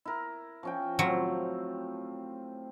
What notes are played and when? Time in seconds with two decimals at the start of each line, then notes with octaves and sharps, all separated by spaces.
0.05 E4 A#4
0.63 F3 C#4 G5
0.99 A2 F#3 C4 F4